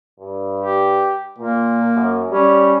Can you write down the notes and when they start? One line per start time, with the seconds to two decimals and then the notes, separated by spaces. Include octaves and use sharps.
0.20 G2
0.61 G4
1.39 A#2 A#3
1.95 F#2
2.31 G3 C#4